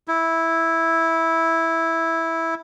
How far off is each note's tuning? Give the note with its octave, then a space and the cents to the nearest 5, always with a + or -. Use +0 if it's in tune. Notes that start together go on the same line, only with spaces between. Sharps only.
E4 -5